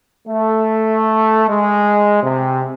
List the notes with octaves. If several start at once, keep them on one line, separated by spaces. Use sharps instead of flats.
A3
G#3
C3